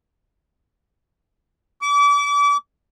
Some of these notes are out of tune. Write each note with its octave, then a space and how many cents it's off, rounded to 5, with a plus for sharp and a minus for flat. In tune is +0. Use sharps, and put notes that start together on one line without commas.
D6 -35